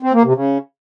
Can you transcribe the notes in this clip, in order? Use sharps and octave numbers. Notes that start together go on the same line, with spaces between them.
C4
A#3
C3
C#3